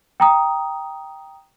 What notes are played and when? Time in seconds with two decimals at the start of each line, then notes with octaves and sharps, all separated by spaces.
0.20 G5 A#5 D#6